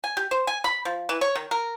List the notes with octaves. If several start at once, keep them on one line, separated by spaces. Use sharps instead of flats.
G#5
G4
C5
G#5
B5
F3
E3
C#5
D#3
A#4